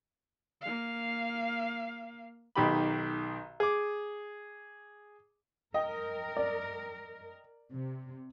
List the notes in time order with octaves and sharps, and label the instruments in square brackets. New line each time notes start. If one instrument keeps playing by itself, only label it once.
[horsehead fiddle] A#3 F5
[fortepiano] B1 D#3 G4 B5
G#4 D6
[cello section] A#4 [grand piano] D#5 G5
[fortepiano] D5
[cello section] C3